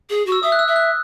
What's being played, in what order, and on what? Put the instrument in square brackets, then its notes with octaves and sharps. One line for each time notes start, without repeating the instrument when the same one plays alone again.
[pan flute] G#4
F#4
[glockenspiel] E6
[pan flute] E5 [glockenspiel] D#6
[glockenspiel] F#6
E6
[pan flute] E5
[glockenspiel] F#6